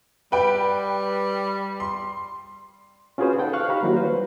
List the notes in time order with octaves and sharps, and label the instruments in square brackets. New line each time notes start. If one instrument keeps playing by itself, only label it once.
[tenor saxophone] G3 [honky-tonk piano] B4 G5
[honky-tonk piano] C6
[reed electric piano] C#4 F4 F#4 G#4 B4 C5
D#4 A4 F#5 G5
F5 C#6 F6 F#6
D#4 G4 C5 F5 A#5 B5
D#3 F#3 G3 A#3 E4 F#4
F#3 B4 C5